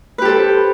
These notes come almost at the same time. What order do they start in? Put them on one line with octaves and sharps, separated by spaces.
B4 G4 A4 C5